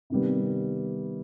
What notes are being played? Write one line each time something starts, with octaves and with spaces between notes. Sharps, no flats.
C3 D#3 G3 B3